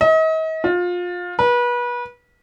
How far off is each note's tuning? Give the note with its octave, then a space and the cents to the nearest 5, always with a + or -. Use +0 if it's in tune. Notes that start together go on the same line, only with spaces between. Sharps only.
D#5 +40
F4 +25
B4 -30